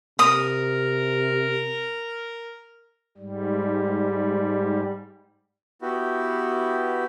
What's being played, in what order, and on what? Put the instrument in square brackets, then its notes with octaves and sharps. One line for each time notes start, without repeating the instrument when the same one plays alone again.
[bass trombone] C3 [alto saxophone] A#4 [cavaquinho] D#6
[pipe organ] G#2 G3
[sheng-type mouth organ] B3 E4 F#4 G4